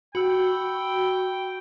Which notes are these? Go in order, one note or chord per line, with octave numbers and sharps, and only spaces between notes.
F#4 G5 B5 E6